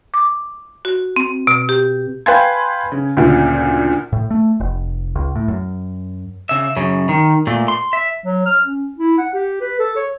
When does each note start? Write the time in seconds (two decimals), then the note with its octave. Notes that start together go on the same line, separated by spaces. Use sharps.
0.14 D6
0.85 F#4
1.16 C4
1.47 B2
1.69 G4
2.26 B4 F5 G5 G#5 C6 G#6
2.92 C#3
3.17 D2 A#2 C#3
4.13 A2
4.31 A3
4.60 F1
5.16 C#2
5.35 A2
5.48 F#2
6.49 C#3 E5
6.77 F#2 C#3
7.09 D#3
7.47 A#2 A3
7.68 C6
7.93 E5
8.26 F#3
8.46 F6
8.64 C#4
8.98 E4
9.18 F#5
9.34 G4
9.61 B4
9.79 A4
9.96 C#5